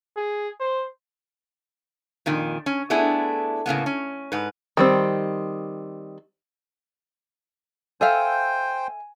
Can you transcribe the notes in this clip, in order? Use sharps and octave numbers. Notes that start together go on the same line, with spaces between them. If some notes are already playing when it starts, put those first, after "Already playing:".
G#4
C5
F2 A#2 D#3
C#4
A3 B3 D4 E4 G#4
A2 C#3 A#3 B3
C#4
G#2 B4
D#3 G3 C4
A4 C5 E5 F5 G5 G#5